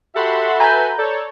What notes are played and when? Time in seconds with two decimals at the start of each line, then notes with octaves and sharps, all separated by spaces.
0.16 F#4 G4 A4 E5 F#5 B5 C6
0.60 B4 G#5 A#5 B5 G6
0.98 A4 C#5 D5